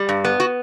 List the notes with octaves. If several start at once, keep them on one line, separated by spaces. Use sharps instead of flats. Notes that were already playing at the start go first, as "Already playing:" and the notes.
Already playing: G3
G2
B3
F#4